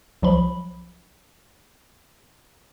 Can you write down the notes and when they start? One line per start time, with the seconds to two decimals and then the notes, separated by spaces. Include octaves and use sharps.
0.22 C2 F3 F#3 B5